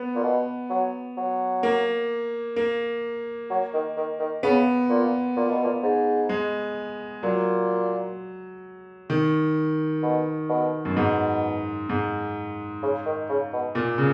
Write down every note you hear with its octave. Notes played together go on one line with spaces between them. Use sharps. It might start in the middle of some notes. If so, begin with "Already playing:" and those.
Already playing: B3
A#2
B2
F#3
F#3
A#3
A#3
F#3
D#3
D#3
D#3
C#3 B3
A#2
A#2
B2
A#2
G#2
G#3
A#2 F#3
D#3
B2
B2
F#2
G#2 B2
G#2
C#3
D#3
C#3
B2
A#2
C#3